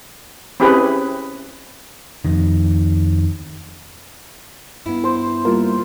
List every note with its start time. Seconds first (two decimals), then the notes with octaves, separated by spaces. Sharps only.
0.60 C4 C#4 E4 G4 G#4 B4
2.25 F2 D#3
4.86 G2 B3 E4
5.04 C5
5.45 G3 A#3 F4 A#4